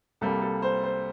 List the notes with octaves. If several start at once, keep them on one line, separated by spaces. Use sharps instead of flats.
C2 C3 G3 A#3 A4
A4
C5
C5